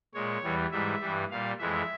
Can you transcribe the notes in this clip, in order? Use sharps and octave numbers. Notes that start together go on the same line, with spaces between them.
A#2 G#3 C#5
E2 E3 G3
G#2 E3 G3 E5
G2 E3 G3
A#2 G3 F5
F2 E3 G#3 E5